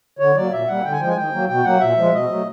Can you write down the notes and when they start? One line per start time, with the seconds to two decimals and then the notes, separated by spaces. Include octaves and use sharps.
0.19 D3 C#5
0.35 F#3 A#3 D5
0.52 A#2 E5
0.67 G3 A#3 F#5
0.84 D3 G5
0.92 G#5
1.00 F3 G#3 G5
1.08 G#5
1.17 D#3 G5
1.33 F#3 A#3
1.48 B2 G5
1.64 F#3 A#3 F#5
1.80 A#2 E5
1.97 F3 G#3
2.13 B2 D#5
2.29 F#3 A3